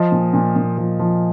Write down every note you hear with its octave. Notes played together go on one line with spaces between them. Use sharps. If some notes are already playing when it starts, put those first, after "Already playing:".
Already playing: F3 D#5
A#2
A#2
A#2
F3
F3